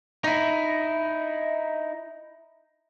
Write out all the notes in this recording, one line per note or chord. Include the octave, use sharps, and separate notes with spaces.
D#4 E4